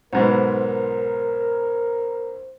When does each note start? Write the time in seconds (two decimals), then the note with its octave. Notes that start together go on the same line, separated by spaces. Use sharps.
0.13 B1 G#2 B3 A#4 C5